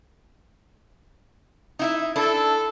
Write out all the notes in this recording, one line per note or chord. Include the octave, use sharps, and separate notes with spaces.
D#4 E4 E5
D4 E4 A4